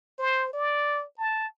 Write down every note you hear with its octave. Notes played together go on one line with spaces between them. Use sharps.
C5
D5
A5